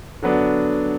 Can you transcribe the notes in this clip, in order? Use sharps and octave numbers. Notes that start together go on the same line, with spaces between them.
D3 F#3 B3 D4